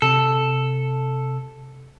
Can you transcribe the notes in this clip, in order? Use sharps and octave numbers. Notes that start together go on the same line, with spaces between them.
C3 A4